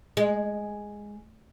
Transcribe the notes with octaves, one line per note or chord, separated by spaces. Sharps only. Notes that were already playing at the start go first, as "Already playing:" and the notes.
G#3